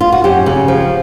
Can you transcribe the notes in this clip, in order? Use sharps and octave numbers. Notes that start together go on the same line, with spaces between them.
F4
F#4
F#2 G4
C#3
F3